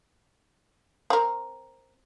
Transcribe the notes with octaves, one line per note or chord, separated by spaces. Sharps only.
C4 A#4